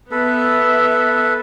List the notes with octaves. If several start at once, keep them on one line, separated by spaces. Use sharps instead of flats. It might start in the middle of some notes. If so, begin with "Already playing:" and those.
B3 A4 B4 E5